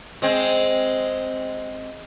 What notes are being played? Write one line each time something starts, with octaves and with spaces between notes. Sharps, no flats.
G#3 C4